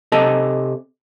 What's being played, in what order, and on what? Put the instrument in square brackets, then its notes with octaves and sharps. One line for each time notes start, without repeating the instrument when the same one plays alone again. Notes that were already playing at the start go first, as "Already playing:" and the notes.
[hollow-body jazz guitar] C3 A4 D#5 A5